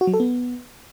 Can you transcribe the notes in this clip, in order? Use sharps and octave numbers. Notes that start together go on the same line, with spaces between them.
F#4
F#3
A4
B3